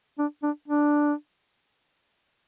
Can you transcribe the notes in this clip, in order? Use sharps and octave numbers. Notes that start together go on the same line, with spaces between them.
D4
D4
D4